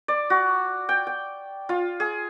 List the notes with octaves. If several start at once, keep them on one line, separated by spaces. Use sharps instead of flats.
D5
F#4
G5
G5
F4
G#4